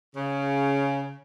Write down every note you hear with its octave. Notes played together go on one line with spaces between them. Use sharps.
C#3